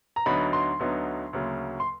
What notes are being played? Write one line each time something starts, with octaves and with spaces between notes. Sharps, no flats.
A#5
D2 D3 F#3 B3 D#4 B5
C6
D2 D3 F#3 B3 D#4
D2 C#3 F#3 A#3
C6